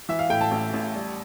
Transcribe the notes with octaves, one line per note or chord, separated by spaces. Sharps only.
E3 E5
F5
A2 G5
A5
A1
A1
G3